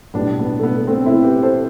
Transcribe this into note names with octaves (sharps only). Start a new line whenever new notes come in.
B1 A2 G3 B3 D4
B3
A3
B3
A3 C4
C4 E4
G4 B4
A4 C5